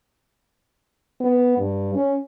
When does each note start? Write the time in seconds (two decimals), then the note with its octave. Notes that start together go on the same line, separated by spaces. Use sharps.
1.20 B3
1.58 G2
1.95 C#4